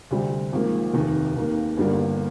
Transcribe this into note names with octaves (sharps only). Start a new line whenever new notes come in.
D2 C3 G3 C4
G#1 G#2 F3 A#3
F1 D#2 D#3
D#2 D#3 A#3
G1 G2 D3 G3 A#3